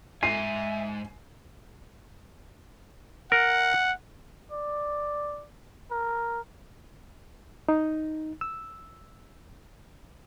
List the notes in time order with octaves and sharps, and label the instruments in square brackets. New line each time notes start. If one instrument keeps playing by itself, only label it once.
[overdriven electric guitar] E2 G#2 [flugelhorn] E5 [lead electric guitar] G#5 [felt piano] C7
[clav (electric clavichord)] A#4 [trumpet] F#5
[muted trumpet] D5
A#4
[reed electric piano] D#4
E6